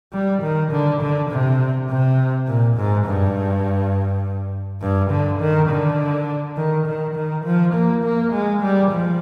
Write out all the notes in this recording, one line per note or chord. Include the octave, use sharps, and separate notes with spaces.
G3
D#3
D3
D3
C3
C3
A#2
G#2
G2
G2
D3
D#3
D3
D#3
D#3
D#3
F3
A#3
A#3
G#3
G3
F3